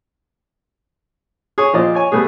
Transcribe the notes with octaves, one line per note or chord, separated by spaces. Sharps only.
G#4 C#5
A#2 F3 D5 D#5
C#5 G#5
G3 A3 B3 G#4